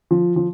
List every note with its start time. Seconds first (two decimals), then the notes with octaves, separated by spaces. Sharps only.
0.11 F3
0.36 F3